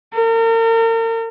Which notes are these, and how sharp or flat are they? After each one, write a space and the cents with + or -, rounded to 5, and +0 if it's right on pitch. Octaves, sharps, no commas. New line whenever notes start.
A#4 -40